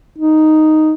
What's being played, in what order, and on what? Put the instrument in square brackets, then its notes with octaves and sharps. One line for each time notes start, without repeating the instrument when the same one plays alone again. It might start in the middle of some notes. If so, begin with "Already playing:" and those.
[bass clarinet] D#4